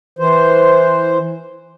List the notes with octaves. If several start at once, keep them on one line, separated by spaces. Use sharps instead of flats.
E3 C5